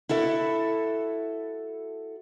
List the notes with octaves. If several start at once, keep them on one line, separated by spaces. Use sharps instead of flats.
E4 F#4 A4 E5